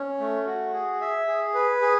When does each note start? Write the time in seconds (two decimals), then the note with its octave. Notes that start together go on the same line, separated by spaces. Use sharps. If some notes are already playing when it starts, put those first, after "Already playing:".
Already playing: C#4
0.20 A3
0.47 F#4
0.74 G#4
1.01 E5
1.28 G#4
1.54 B4
1.82 G#4